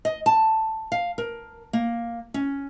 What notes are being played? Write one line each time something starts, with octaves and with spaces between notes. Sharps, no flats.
D#5
A5
F5
A#4
A#3
C#4